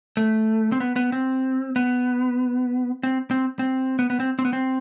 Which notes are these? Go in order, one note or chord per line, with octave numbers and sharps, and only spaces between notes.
A3
C4
B3
B3
C4
B3
C4
C4
C4
B3
B3
C4
C4
B3
C4